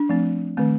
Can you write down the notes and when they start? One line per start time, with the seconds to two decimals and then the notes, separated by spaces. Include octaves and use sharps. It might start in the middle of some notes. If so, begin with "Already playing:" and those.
Already playing: D4
0.09 F3 A3 C4
0.57 D#3 A3 C4